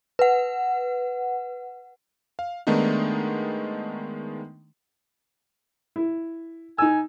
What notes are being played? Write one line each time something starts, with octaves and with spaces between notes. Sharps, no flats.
B4 F#5
F5
D#3 G#3 A3 B3 D4 D#4
E4
D#4 G#5 E6